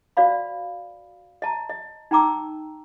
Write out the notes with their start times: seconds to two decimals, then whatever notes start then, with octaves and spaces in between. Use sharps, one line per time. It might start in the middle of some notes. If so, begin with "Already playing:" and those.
0.17 F#4 C5 D5 F5 B5
1.42 D#5 A5 A#5
1.69 D#5
2.11 D#4 G5 A#5 D6 E6